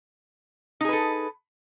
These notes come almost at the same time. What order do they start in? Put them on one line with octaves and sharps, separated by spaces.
D#4 G#4 B4 A4